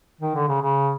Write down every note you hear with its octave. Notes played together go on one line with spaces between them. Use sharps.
D#3
D3
C#3
C#3